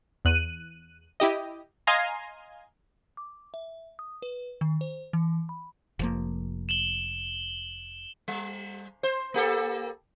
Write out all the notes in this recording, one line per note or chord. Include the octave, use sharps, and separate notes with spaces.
E2 F#6 D#7
E4 G4 D#5
D#5 F5 G#5 A#5 C6
D6
E5
D#6
B4
D#3
C5
E3
B5
F1 F3 A#3
E7 F#7 G7
G3
C5
A#3 G4 A4